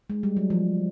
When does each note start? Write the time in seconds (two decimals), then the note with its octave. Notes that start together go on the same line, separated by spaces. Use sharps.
0.10 G#3
0.23 G3
0.37 F#3
0.50 F3